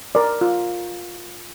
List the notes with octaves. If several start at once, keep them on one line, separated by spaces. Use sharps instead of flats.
A#4 D5
F4